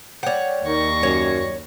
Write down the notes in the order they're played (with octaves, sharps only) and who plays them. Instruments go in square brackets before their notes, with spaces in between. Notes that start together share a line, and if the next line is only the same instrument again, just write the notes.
[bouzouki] C#5 F#5 [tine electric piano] D5 G5
[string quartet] D#2 C#6 A#6 [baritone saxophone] D#3
[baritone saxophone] F#2 [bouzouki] C#5